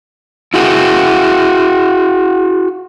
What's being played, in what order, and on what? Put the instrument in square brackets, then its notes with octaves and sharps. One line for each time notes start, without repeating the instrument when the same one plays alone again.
[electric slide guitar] E4 F#4 G#4